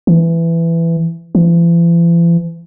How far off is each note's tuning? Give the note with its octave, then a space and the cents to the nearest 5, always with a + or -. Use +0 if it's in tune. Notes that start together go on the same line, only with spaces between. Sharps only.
E3 +15
E3 +45